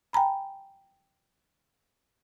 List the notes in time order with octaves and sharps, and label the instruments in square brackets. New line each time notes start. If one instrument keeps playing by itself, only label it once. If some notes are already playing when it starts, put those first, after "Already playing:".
[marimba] G5 G#5 A#5 B5